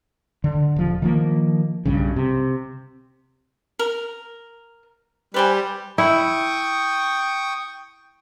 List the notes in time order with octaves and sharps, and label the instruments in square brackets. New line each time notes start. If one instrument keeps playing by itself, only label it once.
[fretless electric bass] D3
D#1 F3
D#3 F3 A#3
B1 G2 C#3
C3
[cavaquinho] A#4
[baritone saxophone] G3 [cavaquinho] B4 C5 G#5
[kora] E4 [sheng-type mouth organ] G5 C#6 D#6